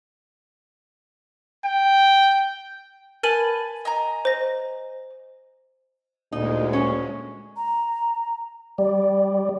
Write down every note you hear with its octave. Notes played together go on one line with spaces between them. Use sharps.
G5
A#4 B4 G#5 A5 D#7 F#7
D#5 G#5 A#5
C5 A#6
D2 A#2 G#3 D#4
C#4 C#5
A#5
G3 D5